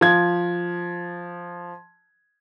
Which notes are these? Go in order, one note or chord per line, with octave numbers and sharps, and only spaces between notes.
F3 G#6